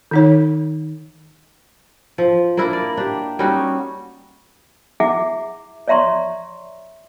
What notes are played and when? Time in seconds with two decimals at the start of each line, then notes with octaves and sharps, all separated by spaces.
0.11 D#3 D#4 C#5
2.18 F3
2.57 A#3 D4 E4 A#4
2.73 D5
2.97 D4 G4
3.39 G3 C#4 D#4 F#4
5.00 E4 G#4 E5 F#5 D6
5.88 C#5 D5 E5 A#5 C6 C#6